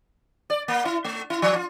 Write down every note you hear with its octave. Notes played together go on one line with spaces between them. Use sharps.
D5
A#3
E4
A3
E4
F3
F4